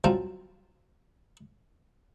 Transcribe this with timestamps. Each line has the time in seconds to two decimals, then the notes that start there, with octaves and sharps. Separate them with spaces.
0.04 F#3 G3 C4 F4 G5 A5